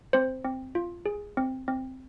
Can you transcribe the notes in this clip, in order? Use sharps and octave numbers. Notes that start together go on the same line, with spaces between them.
C4 C5
C4
F4
G#4
C4
C4